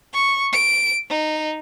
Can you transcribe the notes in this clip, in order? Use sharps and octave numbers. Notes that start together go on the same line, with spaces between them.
C#6
D7
D#4